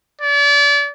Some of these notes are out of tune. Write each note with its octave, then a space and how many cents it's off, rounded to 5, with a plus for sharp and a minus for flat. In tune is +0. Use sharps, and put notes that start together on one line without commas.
D5 -35